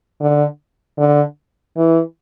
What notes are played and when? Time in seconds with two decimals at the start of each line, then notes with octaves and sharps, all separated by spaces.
0.20 D3
0.98 D3
1.77 E3